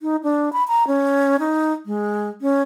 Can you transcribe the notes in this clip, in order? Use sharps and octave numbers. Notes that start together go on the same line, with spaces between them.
D#4
D4
B5
A#5
C#4
D#4
G#3
C#4